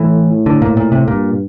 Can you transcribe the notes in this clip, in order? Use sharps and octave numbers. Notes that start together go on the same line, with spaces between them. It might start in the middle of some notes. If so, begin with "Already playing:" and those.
Already playing: A2 E3
D3
A#2
A#2
C3
G2 A#2